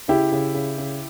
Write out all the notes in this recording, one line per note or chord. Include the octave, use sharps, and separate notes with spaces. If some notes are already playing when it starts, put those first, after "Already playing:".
C#3 E4 G4
C#3
C#3
C#3